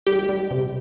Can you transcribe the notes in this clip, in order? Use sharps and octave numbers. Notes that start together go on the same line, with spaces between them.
G3 G4
G3
C3